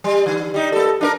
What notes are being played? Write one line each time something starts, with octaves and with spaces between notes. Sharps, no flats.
G3
D3
G3 D#4
A#3 A4
D4 D#4 A#4